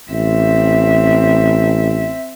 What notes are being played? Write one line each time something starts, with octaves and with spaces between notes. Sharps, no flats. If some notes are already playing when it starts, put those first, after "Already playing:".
A1 C4 E5